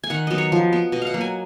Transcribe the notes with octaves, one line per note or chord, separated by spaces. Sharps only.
G#5
D#3 F#5
F#3 B3 D#5
C#5
F3
B3
B2 D#5
F5 F#5
F#3 A#3
G#5